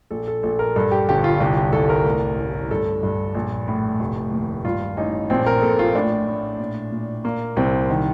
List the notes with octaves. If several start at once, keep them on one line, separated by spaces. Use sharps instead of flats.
A#1 A4
A4
A#1 A4
A#4
G2 A4
G4
G1 G4
F4
C2 G4
G4
C2 A4
A#4
A2
A1
G2 A4
G2
A#1
A2
F1
D#2
G2 F4
A1 D#4
A#1 C4
A#4
A#2 A4
F4
A2 D4
A2
A#2
A#2
A#2 A#3
C2 C4
D#3